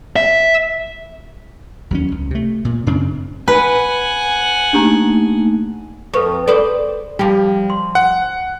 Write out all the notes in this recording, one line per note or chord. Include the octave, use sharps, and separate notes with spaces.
E5
D#2 F#3 C#4
C#2
C3 A3
A#2
F#2 C#3 C4 D4
B4 F#5 G#5
A3 A#3 D4 D#4 G4 A#5
F2 A4 B4 C#6
G#4 A4 B4 C5 D5
F3 G3 G4
C6
F#5